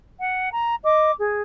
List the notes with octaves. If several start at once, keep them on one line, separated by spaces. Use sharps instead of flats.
F#5
A#5
D#5 D6
G#4